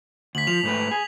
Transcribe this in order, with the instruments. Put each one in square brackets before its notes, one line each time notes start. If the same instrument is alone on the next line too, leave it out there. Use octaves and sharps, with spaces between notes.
[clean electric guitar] D2 [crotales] B6 F#7
[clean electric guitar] F3 [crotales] F7
[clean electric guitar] G#2 A3 B4
G#4